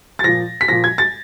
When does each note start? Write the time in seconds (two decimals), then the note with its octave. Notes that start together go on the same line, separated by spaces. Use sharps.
0.19 A6
0.24 A#2 F3 A#6
0.61 B6
0.68 A#2 F3 A#6
0.84 G#6
0.98 A6